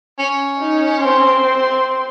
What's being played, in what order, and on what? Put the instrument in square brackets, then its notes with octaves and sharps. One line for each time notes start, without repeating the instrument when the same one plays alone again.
[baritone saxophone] C#4
[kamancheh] D#4
C4 C6